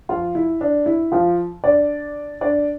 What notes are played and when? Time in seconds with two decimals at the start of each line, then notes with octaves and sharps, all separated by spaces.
0.09 F3 F4
0.35 E4
0.61 D4
0.86 E4
1.12 F3 F4
1.64 D4 D5
2.41 D4 D5